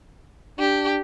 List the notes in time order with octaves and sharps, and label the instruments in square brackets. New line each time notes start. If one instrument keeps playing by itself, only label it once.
[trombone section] D4 [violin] G4